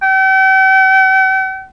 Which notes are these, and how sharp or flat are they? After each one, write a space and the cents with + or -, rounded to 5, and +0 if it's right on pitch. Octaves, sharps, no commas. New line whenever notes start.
G5 -45